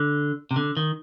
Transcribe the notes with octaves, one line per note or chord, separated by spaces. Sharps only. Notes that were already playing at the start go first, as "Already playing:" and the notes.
Already playing: D3
C3
D3
D#3